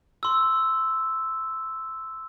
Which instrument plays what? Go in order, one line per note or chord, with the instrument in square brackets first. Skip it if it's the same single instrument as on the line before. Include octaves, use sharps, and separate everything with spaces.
[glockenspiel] C6 E6